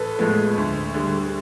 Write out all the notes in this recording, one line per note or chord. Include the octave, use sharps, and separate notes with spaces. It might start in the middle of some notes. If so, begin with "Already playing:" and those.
Already playing: A1 A4 B4
A2 F3 G#3 B3
D2
D3 G3